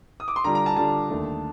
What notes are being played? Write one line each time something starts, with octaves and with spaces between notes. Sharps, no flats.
D#6
D6
C6
D3 G3 D4 F4 A#5
A#5
A5
D3 G3 D4 F4 A5
D#2 D3 A3 D4